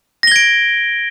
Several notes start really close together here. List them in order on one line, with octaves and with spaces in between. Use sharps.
A#6 G7 G#6 D7